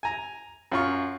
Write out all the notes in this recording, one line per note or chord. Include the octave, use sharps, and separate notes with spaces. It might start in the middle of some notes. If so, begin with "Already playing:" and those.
G#5 A#5
F#2 F4 C#6